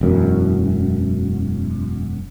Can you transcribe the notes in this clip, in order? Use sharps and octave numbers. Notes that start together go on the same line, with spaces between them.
E1 F#2